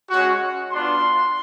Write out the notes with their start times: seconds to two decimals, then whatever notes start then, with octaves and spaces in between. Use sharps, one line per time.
0.10 G#3 C#4 F#4
0.72 B3 D4 F4 C6